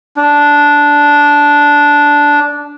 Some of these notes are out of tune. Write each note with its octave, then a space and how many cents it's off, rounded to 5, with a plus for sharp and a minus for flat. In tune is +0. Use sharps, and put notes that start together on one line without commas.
D4 -10